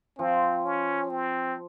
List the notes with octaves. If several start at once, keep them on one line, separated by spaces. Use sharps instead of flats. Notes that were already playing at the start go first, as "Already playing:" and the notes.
F3 C4
C#4
C4